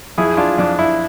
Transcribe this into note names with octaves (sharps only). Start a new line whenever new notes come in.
F2 E4 G#4
D4 F4
F2 D4
E4